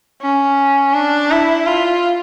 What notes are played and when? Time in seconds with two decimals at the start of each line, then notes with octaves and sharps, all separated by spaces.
0.22 C#4
0.94 D4
1.31 E4
1.66 F4